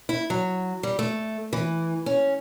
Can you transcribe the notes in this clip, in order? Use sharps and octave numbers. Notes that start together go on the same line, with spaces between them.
E4
F#3
G3
A3
E3
C#4